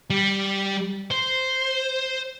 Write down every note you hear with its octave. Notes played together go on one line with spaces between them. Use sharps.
G3
C5